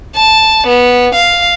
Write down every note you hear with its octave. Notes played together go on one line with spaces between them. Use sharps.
A5
B3
F5